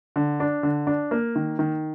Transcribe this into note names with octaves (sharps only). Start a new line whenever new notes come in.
D3
D4
D3
D4
A#3
D#3
D#3